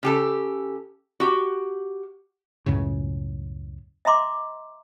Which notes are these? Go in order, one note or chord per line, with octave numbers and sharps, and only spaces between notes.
C#3 G4 A4
F#4 G4
C#2 F#2 A2 C#3
D#5 E5 A#5 C6 D6